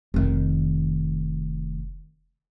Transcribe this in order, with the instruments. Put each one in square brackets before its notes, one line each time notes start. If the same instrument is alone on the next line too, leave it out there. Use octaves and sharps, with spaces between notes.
[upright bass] F1 D#3